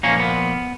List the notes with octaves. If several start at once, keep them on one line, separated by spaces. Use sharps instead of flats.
A#2 F3 A#3 C#4
B3